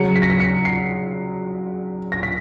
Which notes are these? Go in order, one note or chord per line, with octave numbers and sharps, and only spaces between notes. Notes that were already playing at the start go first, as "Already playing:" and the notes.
Already playing: C#3 F#3 C#7
B6
A#6
B6
C#7
C7
A#6
B6